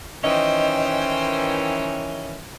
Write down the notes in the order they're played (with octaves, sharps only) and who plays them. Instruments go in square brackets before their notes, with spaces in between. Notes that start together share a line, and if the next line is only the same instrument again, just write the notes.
[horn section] D#3 E3 C#4 [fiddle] C5 G5 [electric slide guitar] D#5